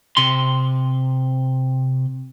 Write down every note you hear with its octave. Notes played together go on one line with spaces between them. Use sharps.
C3 C6